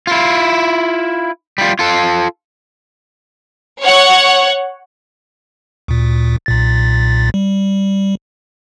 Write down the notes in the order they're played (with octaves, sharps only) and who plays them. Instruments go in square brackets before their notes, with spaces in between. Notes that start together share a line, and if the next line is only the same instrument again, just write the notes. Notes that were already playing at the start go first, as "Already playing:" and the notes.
[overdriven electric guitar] E4 F4
G3 F4
F4 A4
[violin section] C#5 F#5
[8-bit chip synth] D2 A#2
B1 A#2 A6
G3